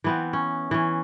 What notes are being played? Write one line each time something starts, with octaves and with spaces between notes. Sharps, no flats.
E3 B3 C4
C#4
E3 C#4